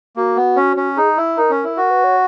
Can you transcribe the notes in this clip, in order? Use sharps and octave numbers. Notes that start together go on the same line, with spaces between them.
A#3 F#4
B3
C#4
C#4
D#4 G#4
E4
D#4 A#4
C#4
E4
F#4 A#4
B4
C#5